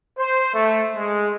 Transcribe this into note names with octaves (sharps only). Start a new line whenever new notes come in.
C5
A3
G#3